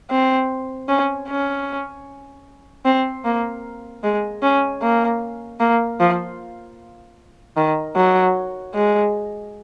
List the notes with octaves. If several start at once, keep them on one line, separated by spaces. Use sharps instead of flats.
C4
C#4
C#4
C4
A#3
G#3
C#4
A#3
A#3
F3
D#3
F#3
G#3